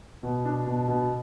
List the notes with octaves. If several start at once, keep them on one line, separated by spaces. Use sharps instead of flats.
B2
D4
B2
B2